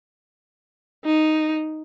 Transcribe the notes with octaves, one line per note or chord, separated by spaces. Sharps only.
D#4